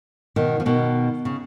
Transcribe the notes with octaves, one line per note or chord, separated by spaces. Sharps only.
B2 D#3
F3
B2 D#3
C#3